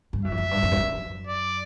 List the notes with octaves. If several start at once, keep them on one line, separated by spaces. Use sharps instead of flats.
G2
F#2 E5
F2
F#2
G2
F2
G2
F#2
D5